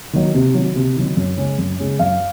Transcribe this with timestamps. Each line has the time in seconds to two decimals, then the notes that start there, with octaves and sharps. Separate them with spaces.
0.13 D#3 F#3
0.34 C3
0.55 D#3 F#3
0.76 C3
0.96 D#3 F#3
1.17 F#2
1.38 C#3 G#3 C#4
1.59 F#2
1.79 C#3 G#3 C#4
1.99 F#2 F5